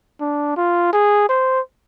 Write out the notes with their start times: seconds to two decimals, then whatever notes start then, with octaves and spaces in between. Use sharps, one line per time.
0.21 D4
0.57 F4
0.93 G#4
1.29 C5